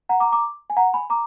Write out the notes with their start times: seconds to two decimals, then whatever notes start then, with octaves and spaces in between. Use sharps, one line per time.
0.09 F#5 A#5
0.20 A#5 D6
0.32 A#5 D6
0.70 G#5
0.77 F#5 A#5
0.94 G#5 B5
1.10 A#5 D6